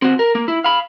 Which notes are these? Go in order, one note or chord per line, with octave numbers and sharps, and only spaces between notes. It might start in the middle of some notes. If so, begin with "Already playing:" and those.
C4 F#4
A#4
A#3
E4
F5 B5